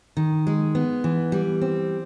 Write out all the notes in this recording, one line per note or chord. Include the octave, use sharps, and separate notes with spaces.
D#3
G#3
B3
E3
G3
C4